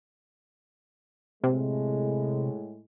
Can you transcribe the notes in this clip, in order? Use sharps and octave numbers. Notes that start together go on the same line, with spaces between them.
A2 C3 G#3